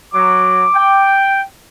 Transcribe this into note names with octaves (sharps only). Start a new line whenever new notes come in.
F#3 D6
G5